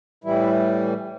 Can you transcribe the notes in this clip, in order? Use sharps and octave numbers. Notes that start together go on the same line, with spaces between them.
A2 E3 G3 E4